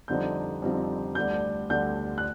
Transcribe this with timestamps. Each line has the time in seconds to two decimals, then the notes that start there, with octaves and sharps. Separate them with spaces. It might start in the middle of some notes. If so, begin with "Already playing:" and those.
0.08 F2 D3 G3 C4 D#4 G6
0.62 F2 D3 G3 C4 D#4
1.15 D2 D3 G3 G6
1.70 D2 D3 G3 G6
2.18 F#6